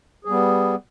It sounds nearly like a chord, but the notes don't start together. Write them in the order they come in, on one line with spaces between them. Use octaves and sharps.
G#4 G3 B3